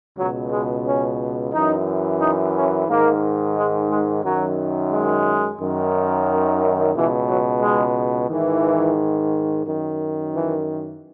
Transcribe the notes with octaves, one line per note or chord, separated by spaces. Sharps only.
C#2 B2 F#3
G#3
C#4
F#2 E3 D#4
D#4
C#4
G#2 D#3 A#3
G#3
G#3
F#2 D#3 F#3
G#3
F#2 D#3
C#2 B2 E3
F#3
G#3
G#2 D#3 E3
F#2 D#3
E3